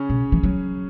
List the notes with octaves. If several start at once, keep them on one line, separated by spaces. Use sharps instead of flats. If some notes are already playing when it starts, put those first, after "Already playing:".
Already playing: C#3 C#4
B2
E3
F#3